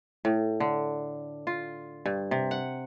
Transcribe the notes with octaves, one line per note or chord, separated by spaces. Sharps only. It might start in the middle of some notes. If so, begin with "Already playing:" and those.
A2
D3
F4
G2
C3
F#5